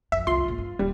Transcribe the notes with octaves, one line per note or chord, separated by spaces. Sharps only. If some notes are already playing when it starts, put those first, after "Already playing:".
A#1 F2 E5
C2 F2 F4 C6
G#1 A#2
G2
D#1 G3